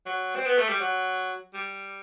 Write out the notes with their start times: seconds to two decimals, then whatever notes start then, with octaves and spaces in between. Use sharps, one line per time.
0.06 F#3
0.36 C4
0.46 B3
0.58 A3
0.69 G3
0.80 F#3
1.54 G3